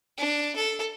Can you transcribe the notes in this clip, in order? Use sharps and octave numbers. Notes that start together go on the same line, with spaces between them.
D4
A4